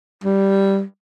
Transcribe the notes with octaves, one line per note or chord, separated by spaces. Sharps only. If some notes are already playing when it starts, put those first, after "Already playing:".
G3